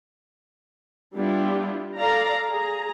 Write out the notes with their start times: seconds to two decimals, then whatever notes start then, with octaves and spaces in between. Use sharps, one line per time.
1.15 G3 B3 D4 E4 F4 G4
1.97 A4 D5 F5 A#5
2.48 G#4 A#5